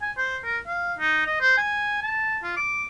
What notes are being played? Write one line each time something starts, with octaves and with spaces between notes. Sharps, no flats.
G#5
C5
A#4
F5
D#4
D#5
C5
G#5
A5
F4
D6